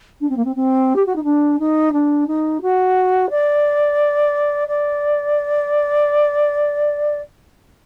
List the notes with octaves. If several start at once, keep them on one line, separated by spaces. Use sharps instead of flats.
D4
C4
A#3
C4
C4
G4
F#4
D#4
D4
D#4
D4
D#4
F#4
D5
D5